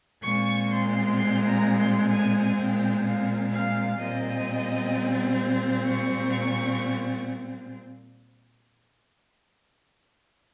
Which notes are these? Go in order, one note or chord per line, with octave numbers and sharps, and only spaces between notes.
A#2 G#3 C4 C#6
C6
C6
A#5
C6
G#5
G5
F5
F5
A#2 G3 C4 D#5
C#6